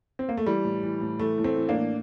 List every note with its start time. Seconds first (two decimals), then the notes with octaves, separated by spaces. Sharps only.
0.19 C4
0.29 A#3
0.37 A3
0.46 E3 G3
0.65 A2
0.83 E3
1.01 A2
1.19 E3 A3
1.38 A2
1.44 A3 C4
1.56 E3
1.69 A#3 D4
1.75 A2